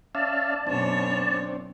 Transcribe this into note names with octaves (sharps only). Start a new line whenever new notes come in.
C#4 D5 E5 F5 A5
F#2 B2 C4 D4 C#5